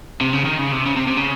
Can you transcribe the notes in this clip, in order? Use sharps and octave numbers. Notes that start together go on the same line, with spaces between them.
C3
C#3
D#3
C#3
C3
C#3
C3
C3
C#3